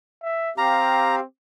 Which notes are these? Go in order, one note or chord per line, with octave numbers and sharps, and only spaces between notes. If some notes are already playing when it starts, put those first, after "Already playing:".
E5
C4 G4 F5 A#5